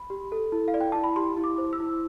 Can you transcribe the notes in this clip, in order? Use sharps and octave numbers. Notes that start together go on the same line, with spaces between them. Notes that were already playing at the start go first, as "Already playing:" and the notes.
Already playing: B5
G4
A4
E4
F5
D5
G5
E4 A5
B5
G4 C6
E4
D6
C5
E6
E4